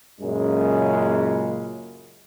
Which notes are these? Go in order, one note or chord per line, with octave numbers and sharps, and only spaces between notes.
F#2 A#2 C#3 G#3